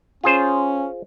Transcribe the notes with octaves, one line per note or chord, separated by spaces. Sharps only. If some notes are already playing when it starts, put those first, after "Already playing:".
C#4 F4 G#4 C5